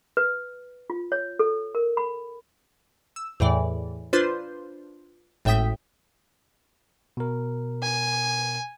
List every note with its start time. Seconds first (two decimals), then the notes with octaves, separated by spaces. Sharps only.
0.17 B4
0.90 F4
1.12 C#5
1.39 A4
1.75 A#4
1.97 B5
3.16 E6
3.40 E2 A2 E3 D5
4.13 D4 F4 B4 C5 C6 G6
5.45 G#1 A2 E5 G5 D#6 B6
7.17 B2 A#4
7.83 G#5